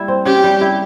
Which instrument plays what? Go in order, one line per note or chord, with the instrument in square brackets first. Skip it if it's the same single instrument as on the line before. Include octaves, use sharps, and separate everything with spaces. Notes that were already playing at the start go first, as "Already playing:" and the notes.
Already playing: [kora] G3 A#3 E4
C4
[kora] C#3 [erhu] G4
[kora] G3
E4